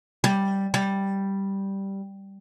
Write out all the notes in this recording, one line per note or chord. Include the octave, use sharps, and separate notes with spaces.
G3
G3